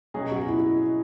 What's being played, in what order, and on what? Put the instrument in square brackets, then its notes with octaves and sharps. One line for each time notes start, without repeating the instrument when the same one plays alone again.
[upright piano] B2 F#3 C#4 G#4 D#5
[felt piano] F#4
E4